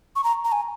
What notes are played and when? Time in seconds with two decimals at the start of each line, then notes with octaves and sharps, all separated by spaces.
0.16 C#6
0.24 A#5
0.45 A#5
0.52 G#5